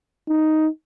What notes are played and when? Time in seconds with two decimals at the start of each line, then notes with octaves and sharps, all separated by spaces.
0.28 D#4